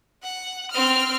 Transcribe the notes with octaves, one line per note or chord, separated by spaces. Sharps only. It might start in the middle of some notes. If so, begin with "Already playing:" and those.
F#5
C4 F6